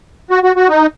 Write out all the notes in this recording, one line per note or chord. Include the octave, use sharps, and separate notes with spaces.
F#4
F#4
F#4
D#4